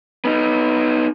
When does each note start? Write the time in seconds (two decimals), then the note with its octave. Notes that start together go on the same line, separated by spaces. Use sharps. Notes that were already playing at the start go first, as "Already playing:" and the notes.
0.25 B3 D#4